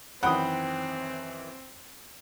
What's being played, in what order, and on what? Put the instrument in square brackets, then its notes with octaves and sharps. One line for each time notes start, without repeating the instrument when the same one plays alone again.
[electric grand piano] F#2 D#3 E3 [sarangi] C4 [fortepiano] F#5 D#6 [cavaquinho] G5 B5